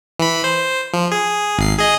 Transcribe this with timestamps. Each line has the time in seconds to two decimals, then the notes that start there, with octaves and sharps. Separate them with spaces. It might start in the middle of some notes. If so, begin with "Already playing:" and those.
0.19 E3 B5
0.44 C5
0.93 F3
1.12 G#4
1.58 G#1 C7
1.79 G#4 D#5